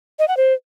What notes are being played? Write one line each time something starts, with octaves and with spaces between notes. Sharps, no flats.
D#5
F#5
C5